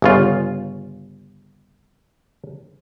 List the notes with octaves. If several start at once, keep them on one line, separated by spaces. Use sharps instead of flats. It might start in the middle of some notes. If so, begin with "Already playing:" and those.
G1 C#3 F4